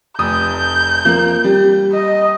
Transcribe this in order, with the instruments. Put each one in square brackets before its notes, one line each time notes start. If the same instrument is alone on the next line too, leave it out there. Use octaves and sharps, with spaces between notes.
[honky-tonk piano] F1 D#6 [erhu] G6
[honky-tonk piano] F3 A#3
G3
[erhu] D#5